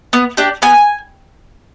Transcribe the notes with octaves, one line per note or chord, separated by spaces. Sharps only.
B3
D4 G4
B3 G#5